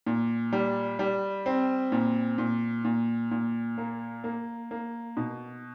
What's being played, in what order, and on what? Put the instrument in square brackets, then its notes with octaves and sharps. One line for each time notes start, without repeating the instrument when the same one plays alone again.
[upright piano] A#2
G3
G3
C4
A#2
A#2
A#2
A#2
A#3
A#3
A#3
B2